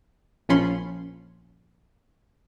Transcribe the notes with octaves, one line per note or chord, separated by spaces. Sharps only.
A#1 F3 C#4 B5 C6